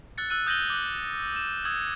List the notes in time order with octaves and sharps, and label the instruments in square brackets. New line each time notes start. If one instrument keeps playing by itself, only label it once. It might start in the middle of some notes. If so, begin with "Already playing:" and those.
[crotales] E6 F#6 A6 C#7
E6 F#6 D#7
D#6 G6 A#6 D#7 F#7 G7
D6 F#6
E7
D#6 E6 G#6